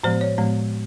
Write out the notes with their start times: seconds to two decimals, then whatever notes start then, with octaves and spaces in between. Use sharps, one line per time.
0.04 A2 F3 G#3 B3 C5
0.21 C#5
0.38 A2 F3 G#3 B3